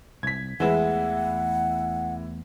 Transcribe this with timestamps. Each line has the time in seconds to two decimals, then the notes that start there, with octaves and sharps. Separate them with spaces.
0.23 C2 G#6 B6
0.60 E2 E3 G#3 A3 E4 E5 F#5